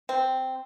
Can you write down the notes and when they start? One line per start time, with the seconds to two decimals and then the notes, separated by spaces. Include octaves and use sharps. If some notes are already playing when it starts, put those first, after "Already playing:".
0.09 C4